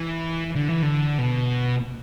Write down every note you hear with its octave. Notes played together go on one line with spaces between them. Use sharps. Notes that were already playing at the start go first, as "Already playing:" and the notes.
Already playing: E3
D3
E3
D3
B2